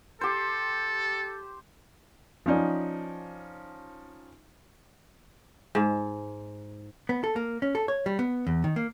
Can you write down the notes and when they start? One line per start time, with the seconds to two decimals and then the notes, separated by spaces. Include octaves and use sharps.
0.21 G4 A4 C5
2.46 F3 C#4 D#4 D5
5.75 G#2
7.09 B3
7.24 A4
7.36 A#3
7.62 C#4
7.75 A4
7.88 C#5
8.06 G3
8.19 B3
8.47 E2
8.64 D#3
8.76 A#3